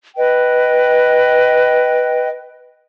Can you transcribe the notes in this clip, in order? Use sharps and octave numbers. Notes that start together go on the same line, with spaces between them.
B4 D#5 G5